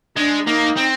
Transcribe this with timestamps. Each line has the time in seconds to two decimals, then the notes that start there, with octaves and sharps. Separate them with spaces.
0.16 G#3 D4
0.47 A#3 D#4
0.77 C4